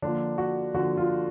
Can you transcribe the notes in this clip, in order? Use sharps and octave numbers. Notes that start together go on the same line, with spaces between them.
D3 F3 A#3 D4
F#4
D3 F3 A#3 F#4
F4